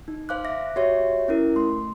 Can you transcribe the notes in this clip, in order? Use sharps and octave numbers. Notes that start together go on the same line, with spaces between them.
D#4
C5 F5 D6 F#6
E5 D6 A#6
F#4 G4 C#5 E5
C#4 E4 A#4
A3 C6